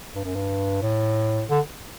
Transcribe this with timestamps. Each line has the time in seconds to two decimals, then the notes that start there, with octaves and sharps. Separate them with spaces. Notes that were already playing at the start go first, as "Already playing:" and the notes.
0.15 G2
0.25 F#2
0.35 G2
0.82 A2
1.50 D3